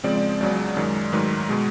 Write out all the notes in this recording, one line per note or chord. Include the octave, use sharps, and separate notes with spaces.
C#3 F3 G#3 C4 D5
D5
C#2 C#3 F#3 B3 D5
F#2 D#3 G#3
G#2 D#3 F#3 A3 B4
B2 G#3